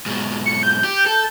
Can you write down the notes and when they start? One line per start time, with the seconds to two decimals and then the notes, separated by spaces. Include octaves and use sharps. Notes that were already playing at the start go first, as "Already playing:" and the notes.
0.06 G#2 B2
0.46 C#7
0.63 G6
0.84 G4
1.06 A4